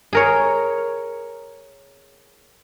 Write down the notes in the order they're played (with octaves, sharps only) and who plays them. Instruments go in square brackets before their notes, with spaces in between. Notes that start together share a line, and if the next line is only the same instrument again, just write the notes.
[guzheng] G#4 A#4 C#5